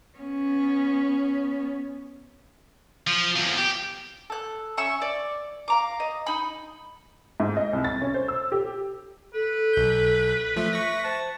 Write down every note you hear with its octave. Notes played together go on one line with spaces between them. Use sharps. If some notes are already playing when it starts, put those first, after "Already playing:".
B3 C#4
F3
E2 F3
G4
A4 F#6
C#4 E5 C#6 E6
D5
F5 A#5 D6
D#5
D#4 B5
G#2
D#5
C2
A6
C#4
C5
E6
G4
A4 B4
B1 G6
F3 A3 E5
C#6 A#6
C5 A5